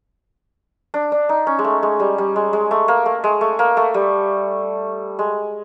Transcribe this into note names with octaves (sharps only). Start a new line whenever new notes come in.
D4
D4
D#4
C#4
G#3
A3
G#3
G3
G3
G#3
G#3
A3
A#3
A3
G#3
A3
A#3
A3
G3
G#3